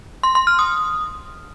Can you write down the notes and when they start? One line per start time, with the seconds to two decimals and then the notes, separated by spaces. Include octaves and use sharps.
0.23 C6
0.35 C6
0.47 F6
0.59 D#6